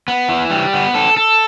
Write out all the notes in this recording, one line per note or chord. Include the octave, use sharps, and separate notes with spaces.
B3
E3
G3
B3
A4
A4